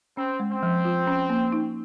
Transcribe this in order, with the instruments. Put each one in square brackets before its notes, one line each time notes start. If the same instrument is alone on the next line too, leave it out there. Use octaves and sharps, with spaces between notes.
[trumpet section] C4 [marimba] C#4
[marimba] G#3
[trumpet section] C4
[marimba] F3
F4
C#4
A#3
D#4